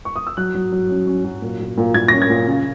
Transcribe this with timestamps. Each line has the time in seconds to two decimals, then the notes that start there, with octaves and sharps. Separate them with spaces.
0.05 C#6
0.16 D#6
0.27 E6
0.37 F#3 F#6
0.55 F#3
0.72 F#3
0.89 C#4
1.07 C#4
1.24 F#3
1.42 A#2
1.60 A#2
1.78 A#2
1.94 A#2 G#6
2.08 C#4 A#6
2.22 G#6
2.30 A#2
2.47 C#3